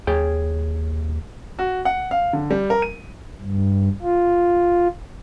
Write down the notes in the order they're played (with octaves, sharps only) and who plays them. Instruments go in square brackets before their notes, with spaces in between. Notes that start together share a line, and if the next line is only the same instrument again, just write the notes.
[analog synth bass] D#2 [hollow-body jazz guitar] G#4 C#5 G5
[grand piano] F#4
F#5
F5
D3
G3
A#4
D#7
[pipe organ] G2
F4